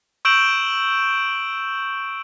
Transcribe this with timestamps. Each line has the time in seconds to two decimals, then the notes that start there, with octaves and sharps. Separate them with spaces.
0.25 C#6 E6 G6 D7 E7 F#7